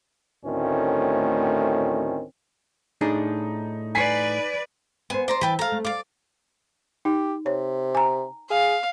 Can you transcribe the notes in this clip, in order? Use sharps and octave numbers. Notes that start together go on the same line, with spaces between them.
D2 A2 D#3 C4 C#4
A2 D4 D#4 G#4
B4 D5 G#5 B6 C7
B3 C5 G#5
C5 D5 A#5 C6
E3 B4 G5 A5
A3 F5 A#5
A3
D5 F5 D6
D#4 G4
C3 C#5
G#5 A#5
G#4 F5